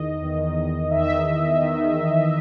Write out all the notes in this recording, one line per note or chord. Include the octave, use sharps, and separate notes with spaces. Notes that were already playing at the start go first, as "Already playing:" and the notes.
Already playing: E2 D#3 D#5
E2 D#3
E2 D#3 E5
E2 D#3